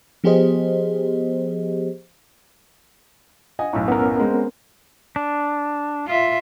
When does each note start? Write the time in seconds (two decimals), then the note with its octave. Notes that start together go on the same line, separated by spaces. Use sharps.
0.24 F3 B3 G4 G#4 C5 D#5
3.59 D#5 F#5 G#5
3.73 B1 F#2 A2
3.88 B3 C#4 A#4
4.20 G#3 C4
5.16 D4
6.07 F4 E5